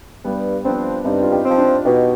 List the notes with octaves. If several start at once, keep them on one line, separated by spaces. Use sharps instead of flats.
G2 G3 B3
F3 B3 C4 D4
G2 C4 D#4
F4
D#4 G4
F3 C4
D4 F4
B2 D#4 G4